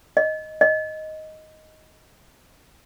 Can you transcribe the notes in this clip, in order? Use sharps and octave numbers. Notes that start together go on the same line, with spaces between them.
D#5
D#5